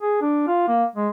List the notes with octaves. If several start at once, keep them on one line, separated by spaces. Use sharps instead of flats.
G#4
D4
F4
A#3
G#3